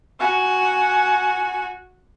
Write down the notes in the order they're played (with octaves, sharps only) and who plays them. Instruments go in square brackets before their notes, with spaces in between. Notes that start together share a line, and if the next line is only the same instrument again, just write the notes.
[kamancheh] F#4 G#5